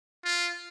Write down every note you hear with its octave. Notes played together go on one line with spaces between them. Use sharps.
F4